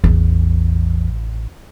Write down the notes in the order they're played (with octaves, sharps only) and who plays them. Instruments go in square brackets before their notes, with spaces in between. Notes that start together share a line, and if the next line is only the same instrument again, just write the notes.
[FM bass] A1 [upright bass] E2